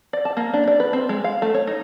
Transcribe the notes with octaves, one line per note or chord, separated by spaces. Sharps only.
D5
A5
A#3
D4
D5
B4
C4
G#3
F5
A3
C#5
D#4